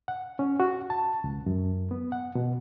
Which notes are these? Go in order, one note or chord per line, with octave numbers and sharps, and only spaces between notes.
F#5
C#4
F#4
A5
C#2
F#2
B3
F#5
B2